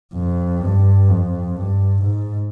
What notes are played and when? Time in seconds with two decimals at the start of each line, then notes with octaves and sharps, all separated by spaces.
0.14 F2
0.61 G2
1.09 F2
1.56 G2
2.03 G#2